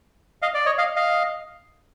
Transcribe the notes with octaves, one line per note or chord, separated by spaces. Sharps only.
D#5 F5
D5
C#5 D#5
D#5 F5
D#5 F5